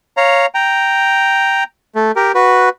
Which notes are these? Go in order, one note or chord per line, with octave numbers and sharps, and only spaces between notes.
C#5 F5 A#5
G5 A#5
A3
G4 A#4
F#4 B4